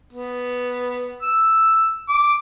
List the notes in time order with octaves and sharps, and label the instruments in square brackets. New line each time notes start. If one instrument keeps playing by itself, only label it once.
[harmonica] B3
E6
D6